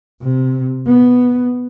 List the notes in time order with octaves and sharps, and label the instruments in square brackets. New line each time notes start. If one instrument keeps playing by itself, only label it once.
[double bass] C3
B3